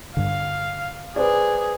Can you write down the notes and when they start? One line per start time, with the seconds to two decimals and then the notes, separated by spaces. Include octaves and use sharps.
0.17 G2 D3 F5
1.16 G#4 B4 C5 D5